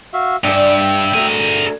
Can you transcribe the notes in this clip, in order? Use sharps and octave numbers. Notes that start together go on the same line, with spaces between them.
F#4 E5 F5
G2 D4 G#4 D5 E5 G5
G4
D2 D3 A3 G#4 A#4